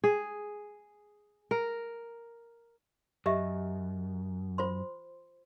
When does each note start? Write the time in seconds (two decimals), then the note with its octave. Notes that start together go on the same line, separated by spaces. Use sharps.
0.04 G#4
1.51 A#4
3.26 F#2 G4 D#5 E5
4.58 F4 C5 C6